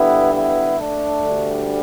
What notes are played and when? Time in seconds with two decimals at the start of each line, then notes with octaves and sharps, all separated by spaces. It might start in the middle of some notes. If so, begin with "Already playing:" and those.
Already playing: G2 D3 G3 B3 E4
0.33 B3 E4
0.78 A3 D4
1.24 D2 D3 G3